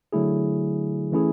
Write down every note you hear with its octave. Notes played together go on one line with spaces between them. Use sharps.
D3 F#3 A3 E4 G#4
E3 A3 C#4 E4 G#4